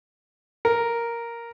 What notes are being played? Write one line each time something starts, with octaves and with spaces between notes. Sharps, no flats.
A#4